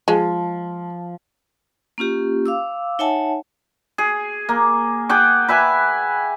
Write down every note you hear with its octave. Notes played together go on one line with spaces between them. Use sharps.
F3 G#3
A#3 C#4 F4 G4
F5 D6 E6
D#4 C#5 E5 F#5 G#5 A5
G#4
A#3
G#4 F#5 G5 D6
B4 E5 G#5